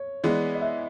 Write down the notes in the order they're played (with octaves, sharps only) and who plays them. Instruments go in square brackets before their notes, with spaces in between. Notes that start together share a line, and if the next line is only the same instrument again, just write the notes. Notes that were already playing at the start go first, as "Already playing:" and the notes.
Already playing: [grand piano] C#5
[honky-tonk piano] E3 G#3 B3 [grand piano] D5
[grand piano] D#5
E5